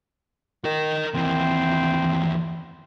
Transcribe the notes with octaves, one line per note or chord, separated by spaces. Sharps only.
D#3 A#4 D#5
D#2 E3 C4